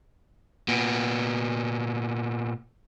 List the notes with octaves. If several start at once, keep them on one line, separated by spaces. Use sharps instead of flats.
A#2 B3